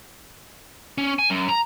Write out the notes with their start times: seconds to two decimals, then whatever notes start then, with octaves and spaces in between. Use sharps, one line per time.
0.98 C#4
1.19 G#5
1.30 F#2
1.49 A#5